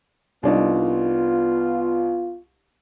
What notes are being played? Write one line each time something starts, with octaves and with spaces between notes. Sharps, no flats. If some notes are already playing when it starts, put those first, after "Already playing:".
C2 B3 D4 D#4 F4